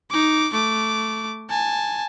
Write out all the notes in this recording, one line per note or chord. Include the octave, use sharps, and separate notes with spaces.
D#4 D6
A3 D6
G#5 A5